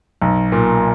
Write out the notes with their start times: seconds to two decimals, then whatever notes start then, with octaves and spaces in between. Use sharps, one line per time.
0.22 B1
0.52 A#2